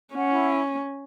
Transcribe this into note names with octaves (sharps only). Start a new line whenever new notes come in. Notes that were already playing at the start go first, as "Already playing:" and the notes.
C#4 F#5
E4